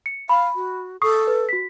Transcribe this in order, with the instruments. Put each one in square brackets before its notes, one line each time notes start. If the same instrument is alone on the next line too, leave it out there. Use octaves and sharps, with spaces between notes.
[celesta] C#7
[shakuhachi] F5 [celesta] B5
[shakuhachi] F#4
[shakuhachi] A4 [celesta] C#6 D#6 C7
[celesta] B4
F#4 B6